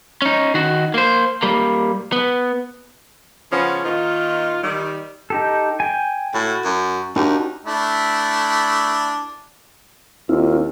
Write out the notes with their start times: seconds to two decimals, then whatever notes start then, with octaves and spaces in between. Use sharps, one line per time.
0.22 C#4 D#4
0.54 D#3 F#4
0.94 A#3 C5
1.43 G3 A#3
2.12 B3
3.52 C#3 F3 B3 C#4
3.84 A#2 D#3 D#4 F4
4.63 D#3 G3
5.30 D#4 G4 A4
5.80 G5 G#5
6.34 A2 F#4
6.64 F#2
7.16 D#2 D4 D#4 F#4
7.65 A3 D4 E4
10.29 D#2 C4 E4 F4